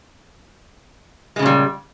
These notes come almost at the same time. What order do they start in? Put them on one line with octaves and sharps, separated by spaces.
G#3 C#3 A#2 G3